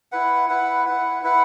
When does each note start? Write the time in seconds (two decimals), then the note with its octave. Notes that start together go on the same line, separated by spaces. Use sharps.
0.12 E4 B4 F#5
0.49 E4 B4 F#5
0.86 E4 B4 F#5
1.23 E4 B4 F#5